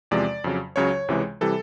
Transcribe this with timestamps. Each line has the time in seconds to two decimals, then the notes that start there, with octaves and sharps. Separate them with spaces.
0.11 E2 C3 F3 G#3 D5
0.44 F2 C#3 F#3
0.76 C#2 C#3 F#3 C#5
1.08 C#2 C3 E3 G#3
1.41 C3 E3 G3 A4